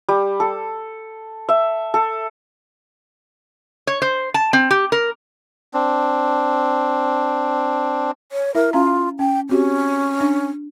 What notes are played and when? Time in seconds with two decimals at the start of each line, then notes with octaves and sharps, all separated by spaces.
0.09 G3
0.40 A4
1.49 E5
1.94 A4
3.87 C#5
4.02 C5
4.34 A5
4.53 C4
4.71 G4
4.92 A#4
5.74 C4 D4
8.32 C#5
8.55 E4 A#4 E5
8.73 C#4 F4 F5 A#5
9.19 C#4 G5
9.49 C4 C#4 F#4 G4
10.21 D4